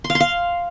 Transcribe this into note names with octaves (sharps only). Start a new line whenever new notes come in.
C6
F5
C6
F5